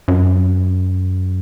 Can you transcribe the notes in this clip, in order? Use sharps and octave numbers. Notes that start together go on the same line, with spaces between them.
F#2